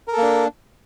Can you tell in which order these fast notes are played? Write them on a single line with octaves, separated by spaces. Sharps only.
A#4 A4 A#3 D4